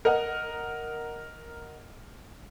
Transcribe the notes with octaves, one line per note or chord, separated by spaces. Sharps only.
A#4 D#5 F#5